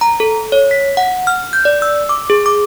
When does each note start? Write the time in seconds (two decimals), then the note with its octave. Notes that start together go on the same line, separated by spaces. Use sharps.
0.01 A#5
0.20 A4
0.52 C#5
0.71 B6
0.97 F#5
1.27 F6
1.53 G6
1.65 D5
1.82 E6
2.09 D6
2.30 G#4
2.46 D6